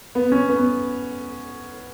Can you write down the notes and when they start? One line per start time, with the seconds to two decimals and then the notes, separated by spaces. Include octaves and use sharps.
0.15 B3
0.32 C#4
0.49 B3